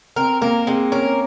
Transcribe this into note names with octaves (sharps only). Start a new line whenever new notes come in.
C4 A#4
A#3 A#4
G#3 C4
C#4 A#4